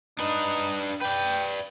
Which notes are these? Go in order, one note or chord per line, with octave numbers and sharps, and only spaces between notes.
D4 D#4 B4
B4 D5 G5